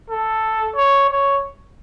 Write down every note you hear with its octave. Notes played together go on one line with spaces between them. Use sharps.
A4
C#5
C#5